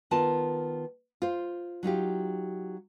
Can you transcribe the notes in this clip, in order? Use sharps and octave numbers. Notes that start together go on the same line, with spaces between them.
D#3 B3 F4 A5
F4 C5
F#3 D#4 F4 G4